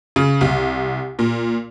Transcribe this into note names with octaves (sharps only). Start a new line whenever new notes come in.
C#3
C2
A#2